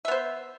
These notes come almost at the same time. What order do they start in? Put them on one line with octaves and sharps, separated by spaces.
E5 B3 C5